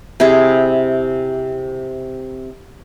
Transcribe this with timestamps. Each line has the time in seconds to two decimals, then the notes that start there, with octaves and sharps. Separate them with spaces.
0.20 C3 E4 G#4 C5